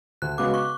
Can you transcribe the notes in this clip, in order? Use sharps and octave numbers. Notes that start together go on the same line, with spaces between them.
D2 F#6
C#3 G#3 B3 F#4 D6
C#6